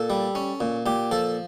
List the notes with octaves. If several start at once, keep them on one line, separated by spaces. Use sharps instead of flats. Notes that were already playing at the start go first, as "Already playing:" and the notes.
Already playing: A#2 A4
G3
C#4
A#2
A#2 G4
F3 A4